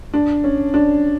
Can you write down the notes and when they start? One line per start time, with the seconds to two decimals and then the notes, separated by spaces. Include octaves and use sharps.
0.14 D4
0.44 C#4
0.74 D4